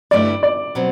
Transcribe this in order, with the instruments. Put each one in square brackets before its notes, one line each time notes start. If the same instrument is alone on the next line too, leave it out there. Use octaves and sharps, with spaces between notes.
[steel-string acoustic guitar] G2 D3 A3 E4 [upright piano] D5
[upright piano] D5
[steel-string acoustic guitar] B2 F#3 C4